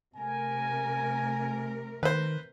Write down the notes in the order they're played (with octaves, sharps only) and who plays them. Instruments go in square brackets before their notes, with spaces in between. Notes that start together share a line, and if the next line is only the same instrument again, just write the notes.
[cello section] C3 A3 A#4 [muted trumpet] G#5
[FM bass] D#3 [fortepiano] B4 C5